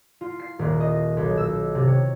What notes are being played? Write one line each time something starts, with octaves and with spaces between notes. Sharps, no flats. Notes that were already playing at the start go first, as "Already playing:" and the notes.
F4
C7
D#1
D#5
B1
E6
C3
C#5